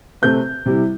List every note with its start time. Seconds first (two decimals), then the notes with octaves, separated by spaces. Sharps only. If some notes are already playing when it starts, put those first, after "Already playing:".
0.22 C3 A3 C4 G6
0.66 C3 G3 E4